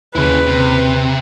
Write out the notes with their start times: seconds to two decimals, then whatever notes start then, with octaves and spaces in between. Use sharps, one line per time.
0.15 D#2 C#3 C#4 E4 B4
0.46 C3